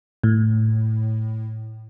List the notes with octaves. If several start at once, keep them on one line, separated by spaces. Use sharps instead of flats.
A2